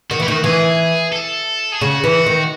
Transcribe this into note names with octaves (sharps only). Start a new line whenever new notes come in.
D#3 F#4
E3 E4
D#3 F#4
E3 G#4
A4
G#4
C#3 F#4
E3
D#3